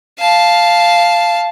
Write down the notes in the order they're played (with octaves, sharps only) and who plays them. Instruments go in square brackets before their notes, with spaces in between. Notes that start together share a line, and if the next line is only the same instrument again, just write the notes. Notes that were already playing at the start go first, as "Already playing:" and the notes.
[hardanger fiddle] F5 A5